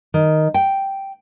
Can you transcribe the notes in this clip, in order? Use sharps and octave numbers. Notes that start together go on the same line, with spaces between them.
D#3
G5